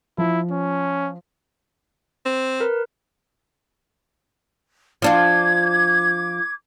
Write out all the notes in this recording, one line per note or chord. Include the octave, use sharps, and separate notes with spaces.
F3 E4
C#4
C4
A#4 B4
F3 D4 F4 D6 G#6